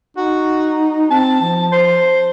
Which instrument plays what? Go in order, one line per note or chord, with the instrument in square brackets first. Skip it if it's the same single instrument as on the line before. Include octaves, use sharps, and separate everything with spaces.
[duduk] D#4 [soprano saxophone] F#4
[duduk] C4 [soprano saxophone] A5
[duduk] F3
[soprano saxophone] C5